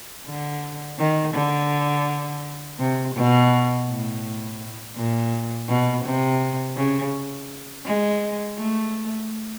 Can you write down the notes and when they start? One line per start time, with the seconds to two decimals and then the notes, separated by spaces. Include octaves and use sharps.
0.26 D3
0.99 D#3
1.34 D3
2.79 C3
3.15 B2
3.87 A2
4.96 A#2
5.68 B2
6.05 C3
6.76 C#3
7.85 G#3
8.57 A3